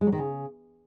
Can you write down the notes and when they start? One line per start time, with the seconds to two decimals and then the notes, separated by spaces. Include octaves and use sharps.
0.01 G#3
0.07 F#3
0.12 D#3
0.18 C#3